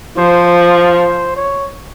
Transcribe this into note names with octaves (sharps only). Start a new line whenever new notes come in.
F3 C5
C5
C#5